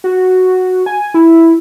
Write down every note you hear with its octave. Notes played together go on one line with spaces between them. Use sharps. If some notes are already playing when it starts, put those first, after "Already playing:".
F#4
G#5
E4